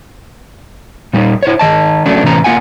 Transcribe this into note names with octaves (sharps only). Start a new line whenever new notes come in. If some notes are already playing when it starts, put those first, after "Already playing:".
A#2 G3 A#3 D#4
E4 C5 C#5
D#3 D#5 A5
F#3 A3 C#4 D4
A2 C3 E3 C#4 A#5
A#3 F4 F#5 G#5